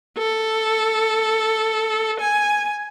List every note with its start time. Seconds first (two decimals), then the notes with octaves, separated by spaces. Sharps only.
0.18 A4
2.20 G#5